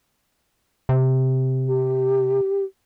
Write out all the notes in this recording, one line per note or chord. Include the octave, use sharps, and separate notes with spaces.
C3
G4